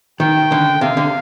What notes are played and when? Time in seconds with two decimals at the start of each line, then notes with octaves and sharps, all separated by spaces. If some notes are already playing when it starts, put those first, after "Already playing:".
0.20 D#3 G5
0.52 D3
0.81 C3 F5
0.97 D3